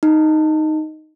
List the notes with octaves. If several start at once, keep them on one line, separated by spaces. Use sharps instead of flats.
D#4